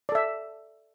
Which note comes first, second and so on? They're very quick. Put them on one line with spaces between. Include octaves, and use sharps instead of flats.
D5 A4 E5